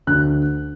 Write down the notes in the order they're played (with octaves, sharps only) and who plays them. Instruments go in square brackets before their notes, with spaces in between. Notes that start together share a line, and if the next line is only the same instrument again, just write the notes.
[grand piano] D2 F#6